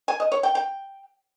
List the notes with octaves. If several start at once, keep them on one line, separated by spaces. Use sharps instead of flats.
G#5
D#5
C#5
G5
G5